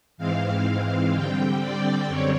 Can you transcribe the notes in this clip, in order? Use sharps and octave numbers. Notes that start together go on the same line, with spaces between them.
G#2 E3 G#3 C4 F5
F5
D3 G3 C4 G5
D5
F#2 D3 G3 C4 C#5